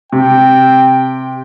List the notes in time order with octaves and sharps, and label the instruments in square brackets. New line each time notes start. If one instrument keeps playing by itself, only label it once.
[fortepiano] C3 [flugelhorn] G5